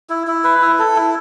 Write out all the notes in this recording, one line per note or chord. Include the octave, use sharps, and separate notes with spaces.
E4
E4
B4
E4
A4
E4